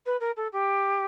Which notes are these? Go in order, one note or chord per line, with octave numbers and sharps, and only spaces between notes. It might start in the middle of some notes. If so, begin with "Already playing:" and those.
B4
A#4
A4
G4